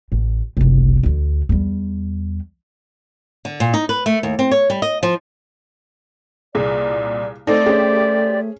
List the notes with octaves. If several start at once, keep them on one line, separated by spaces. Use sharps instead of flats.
A1
F#1 C2
D2 D3
E2 G3
D3
A#2
D#4
B4
A3
D#2
C4
C#5
G3
D#5
F3
C2 A#2 G#4 D5
A3 C4 D#4 A4 D5
C#4 G4 G#4 C5